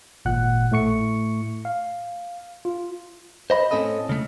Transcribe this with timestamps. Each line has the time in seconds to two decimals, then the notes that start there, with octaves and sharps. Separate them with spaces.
0.25 G#1 A#2 F#5 F#6
0.71 A2 A3 C#6 C#7
1.65 F5
2.65 F4
3.50 C5 D#5 B5
3.71 A2 C4 C#4 A4 D#5
4.09 C#3 A3